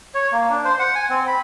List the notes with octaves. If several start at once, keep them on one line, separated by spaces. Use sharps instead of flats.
C#5
A#3
D4
C5
F#5
G#5
C4
B5